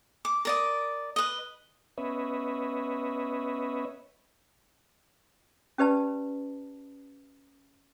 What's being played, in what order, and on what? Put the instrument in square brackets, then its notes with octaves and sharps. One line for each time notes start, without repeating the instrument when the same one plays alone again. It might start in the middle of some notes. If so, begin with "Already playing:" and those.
[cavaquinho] D6
A#4 D5 D#5
B4 D#5
[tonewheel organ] B3 C#4 B4 C#5 D#5 E5
[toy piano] C#4 G4 B4 D5 A5